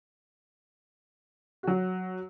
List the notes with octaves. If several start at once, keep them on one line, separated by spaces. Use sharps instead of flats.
F#3 F#4